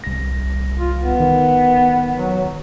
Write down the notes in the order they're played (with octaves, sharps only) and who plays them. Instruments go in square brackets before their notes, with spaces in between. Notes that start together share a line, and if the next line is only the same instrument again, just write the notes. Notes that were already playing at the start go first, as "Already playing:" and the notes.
[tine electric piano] C2 A#6
[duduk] F4
B3
[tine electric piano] D#3
[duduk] F#3